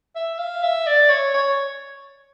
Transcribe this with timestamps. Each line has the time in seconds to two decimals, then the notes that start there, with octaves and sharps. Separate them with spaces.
0.16 E5
0.39 F5
0.63 E5
0.86 D5
1.09 C#5
1.34 C#5